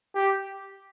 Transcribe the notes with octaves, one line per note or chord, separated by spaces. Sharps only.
G4